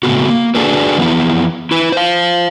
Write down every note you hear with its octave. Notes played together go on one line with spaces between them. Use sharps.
A2 C#3 G#3 A3 B3 F#4
A#3
D4 F#4 G#4 A4 B4
E3 F3 B3 E4
E4 B4
C5 F5